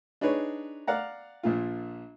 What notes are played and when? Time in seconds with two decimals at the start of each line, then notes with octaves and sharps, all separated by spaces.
0.21 D4 D#4 G#4 B4 C#5
0.87 D5 F5 F#5 A#5
1.43 A#1 A#2 F4